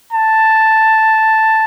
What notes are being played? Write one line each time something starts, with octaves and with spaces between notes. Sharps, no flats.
A5